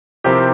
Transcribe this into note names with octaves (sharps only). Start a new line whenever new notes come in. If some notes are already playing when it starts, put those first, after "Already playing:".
C3 F3 C4 E4 G4 A#4